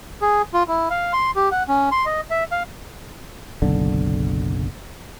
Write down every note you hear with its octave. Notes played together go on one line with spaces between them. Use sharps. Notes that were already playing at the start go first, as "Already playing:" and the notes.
G#4
F4
E4
F5
C6
G4
F#5
C#4
C6
D#5
E5
F5
F#1 B1 D3